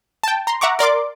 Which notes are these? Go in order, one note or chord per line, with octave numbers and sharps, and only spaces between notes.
G5 A5
A#5 C6
E5 F#5 A#5 C#6 D6
A#4 D5 C6 D6